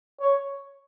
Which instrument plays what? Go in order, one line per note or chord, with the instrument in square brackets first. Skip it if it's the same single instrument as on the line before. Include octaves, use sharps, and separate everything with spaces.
[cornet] C#5